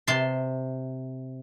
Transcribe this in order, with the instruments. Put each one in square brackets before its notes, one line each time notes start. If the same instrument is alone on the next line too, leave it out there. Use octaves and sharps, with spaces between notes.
[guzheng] C3 A5 C6